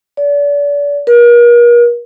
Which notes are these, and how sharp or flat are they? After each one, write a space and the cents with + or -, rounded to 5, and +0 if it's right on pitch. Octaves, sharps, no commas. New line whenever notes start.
D5 -35
A#4 +40